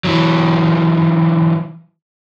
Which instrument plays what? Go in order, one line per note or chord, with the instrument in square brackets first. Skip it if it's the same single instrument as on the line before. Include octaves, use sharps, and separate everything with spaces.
[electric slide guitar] E3 F#3